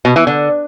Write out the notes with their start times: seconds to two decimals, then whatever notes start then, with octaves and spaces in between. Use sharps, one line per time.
0.05 B2
0.16 E3
0.27 D3